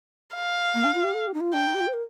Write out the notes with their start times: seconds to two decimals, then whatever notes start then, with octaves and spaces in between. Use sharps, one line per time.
0.35 F5
0.74 A#3
0.84 D4
0.94 F4
1.04 G4
1.14 A4
1.27 G4
1.34 D#4
1.40 F4
1.53 D4 G5
1.67 D#4
1.74 G4
1.80 F4
1.87 C5
1.93 A#4